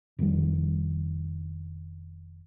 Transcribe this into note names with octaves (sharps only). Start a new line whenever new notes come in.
F1 D#3 G3